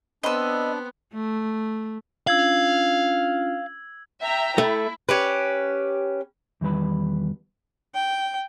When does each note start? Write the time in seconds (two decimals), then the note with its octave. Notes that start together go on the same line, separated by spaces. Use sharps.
0.23 B3 C4 D4 D#5 B5 E6
1.14 A3
2.27 C#4 D4 F4 F5 E6 G#6 F#7
4.21 E5 G5 A#5
4.58 A3 E4
5.09 C#4 G4 B4
6.61 E2 D#3 G3 B4 B5
7.94 G5